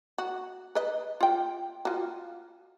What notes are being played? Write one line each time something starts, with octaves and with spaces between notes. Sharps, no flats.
F#4
B4 D#5
F4 G5
F4 F#4